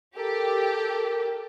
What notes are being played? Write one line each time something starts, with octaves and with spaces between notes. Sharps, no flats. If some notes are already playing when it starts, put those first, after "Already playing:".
G4 A4 A#4